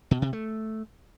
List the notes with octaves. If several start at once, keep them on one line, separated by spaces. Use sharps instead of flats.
B2
C3
A3